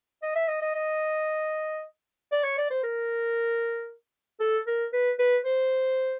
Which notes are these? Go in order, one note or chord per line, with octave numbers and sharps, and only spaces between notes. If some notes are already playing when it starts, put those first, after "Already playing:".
D#5
E5
D#5
D#5
D#5
D5
C#5
D5
C5
A#4
A4
A#4
B4
B4
C5